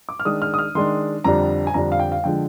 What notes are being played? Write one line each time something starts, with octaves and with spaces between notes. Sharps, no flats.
D6
F6
D#3 G#3 D4 D#6
F6
D#6
F6
D#3 G#3 D4 C6
F2 D3 G3 D4 A#5
G#5
F2 D3 G3 D4 A#5
F5
G5
F5
D3 F3 G#3 G5